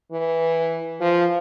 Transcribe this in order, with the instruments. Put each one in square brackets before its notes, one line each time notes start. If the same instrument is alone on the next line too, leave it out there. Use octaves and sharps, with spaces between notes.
[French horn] E3
F3